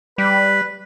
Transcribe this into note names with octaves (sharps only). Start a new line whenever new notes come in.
G3 B4